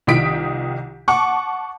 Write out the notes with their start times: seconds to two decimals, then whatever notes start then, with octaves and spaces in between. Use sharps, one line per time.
0.07 C2 D#3 F3 D#6 B6 D7
1.08 F#5 A5 C#6 D6